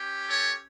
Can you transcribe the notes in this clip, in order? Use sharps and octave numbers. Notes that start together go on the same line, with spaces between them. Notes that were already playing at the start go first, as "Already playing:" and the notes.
Already playing: C#4 G4
A4 C#5